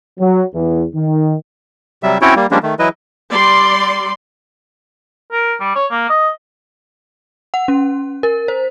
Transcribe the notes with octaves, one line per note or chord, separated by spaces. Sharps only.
F#3
E2
D#3
C3 F#3 G3 E5
C4 C#4 E4 F#4 C#5 G5
G3 A#3
F3 G3 G#3 A#3 C#4 D4
D#3 A3
E3 F#3 E4 B4 D#5
G3 D5 C6
A#4
G3
C#5
A#3
D#5
F#5
C#4
A#4
C5